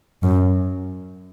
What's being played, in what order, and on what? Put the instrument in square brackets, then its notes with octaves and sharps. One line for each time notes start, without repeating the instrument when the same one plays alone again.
[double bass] F#2